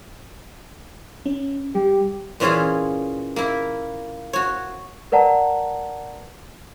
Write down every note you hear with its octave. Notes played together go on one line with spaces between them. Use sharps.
C#4
G3 G4
A#2 E3 C#4 F4 G#4
A#3 E4
F#4 C#5
A#4 B4 D5 F#5 A5 A#5